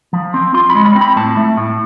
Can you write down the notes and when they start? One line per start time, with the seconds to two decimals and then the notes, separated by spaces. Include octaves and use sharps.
0.13 F3
0.34 C4
0.54 F4 C6
0.70 B5
0.75 G#3
0.85 B5
0.96 C4
1.01 B5
1.17 A2 A5
1.37 A3
1.57 A2